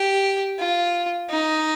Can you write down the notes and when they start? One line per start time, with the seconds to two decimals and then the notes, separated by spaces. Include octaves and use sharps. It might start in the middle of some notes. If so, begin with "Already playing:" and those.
Already playing: G4
0.59 F4
1.30 D#4